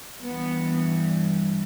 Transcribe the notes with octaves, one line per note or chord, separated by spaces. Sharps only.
G2 E3 B3